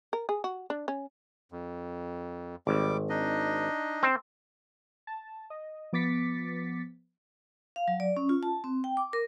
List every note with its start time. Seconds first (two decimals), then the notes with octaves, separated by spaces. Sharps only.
0.13 A#4
0.29 G#4
0.44 F#4
0.70 D4
0.88 C#4
1.52 F2
2.67 G#1 G3 D6
3.09 D4 D#4 D#5
4.03 C4
5.07 A5
5.50 D#5
5.93 F3 B3 D6 A6 B6 C#7
7.76 F5
7.88 F#3
8.00 D5
8.17 C#4
8.29 F4
8.43 A5
8.64 C4
8.84 G5
8.97 D6
9.13 A#4